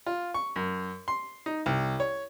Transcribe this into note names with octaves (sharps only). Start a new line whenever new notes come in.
F4
C#6
F#2
C6
D#4
C2
C#5